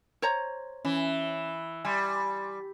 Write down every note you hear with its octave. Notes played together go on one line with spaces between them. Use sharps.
C5 C#5 A#5
E3 C#4
G3 G#5 C6